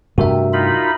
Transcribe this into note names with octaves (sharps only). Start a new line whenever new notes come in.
G2 C3 A3 F#4 A#4 E5
D#4 F4 B5